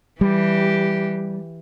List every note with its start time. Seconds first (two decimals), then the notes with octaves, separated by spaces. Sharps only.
0.21 E3 G3 G4